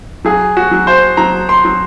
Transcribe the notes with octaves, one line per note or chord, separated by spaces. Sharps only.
F#3 G#4
F#4
F#3
C5
F#3 A#5
C6
F#3